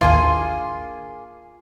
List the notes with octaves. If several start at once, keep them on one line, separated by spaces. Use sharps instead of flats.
A1 D#2 A#3 D4 F4 G#4 G#5 C6